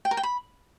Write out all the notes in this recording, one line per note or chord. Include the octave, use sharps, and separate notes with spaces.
G5
A#4
G5
B5